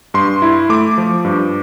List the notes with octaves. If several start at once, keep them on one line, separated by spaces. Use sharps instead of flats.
G2 C6
E4
A3 D6
F3
G2